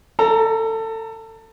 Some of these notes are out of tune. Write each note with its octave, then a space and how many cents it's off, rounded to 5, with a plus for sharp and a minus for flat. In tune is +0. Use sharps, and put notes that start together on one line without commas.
A4 +25 A#5 +0